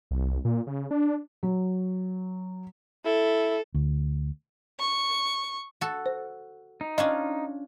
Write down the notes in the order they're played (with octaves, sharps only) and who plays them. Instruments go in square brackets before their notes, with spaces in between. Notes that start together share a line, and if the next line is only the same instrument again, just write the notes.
[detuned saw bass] C2
A#2
C#3
D4
[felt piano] F#3
[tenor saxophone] E4 [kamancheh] A4
[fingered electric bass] D2
[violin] C#6
[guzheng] F#4 A4
[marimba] C5
[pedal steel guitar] D#4
[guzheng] C#4 D4 F4 [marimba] D#5